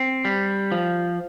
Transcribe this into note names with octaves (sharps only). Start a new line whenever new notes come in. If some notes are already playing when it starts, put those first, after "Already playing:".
Already playing: C4
G3
F3